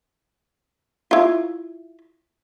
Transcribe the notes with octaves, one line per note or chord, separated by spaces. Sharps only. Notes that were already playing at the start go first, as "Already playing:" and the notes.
E4 F4